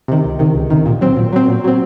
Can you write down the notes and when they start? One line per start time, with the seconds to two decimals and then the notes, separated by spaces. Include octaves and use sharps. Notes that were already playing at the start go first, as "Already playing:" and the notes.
0.08 C3 D#3
0.24 C#2
0.39 C3 D#3
0.55 C#2
0.70 C3 D#3
0.86 A#2
1.01 F#3 C4
1.17 A#2
1.33 F#3 C4
1.48 A#2
1.64 F#3 C4